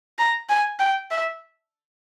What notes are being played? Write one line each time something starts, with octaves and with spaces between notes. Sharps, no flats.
A#5
G#5
G5
E5